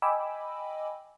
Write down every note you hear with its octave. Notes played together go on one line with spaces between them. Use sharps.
D#5 G5 G#5 B5 D6 E6